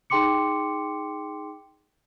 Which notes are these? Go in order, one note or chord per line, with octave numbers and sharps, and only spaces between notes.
D#4 G#4 G5 C6 D6 C#7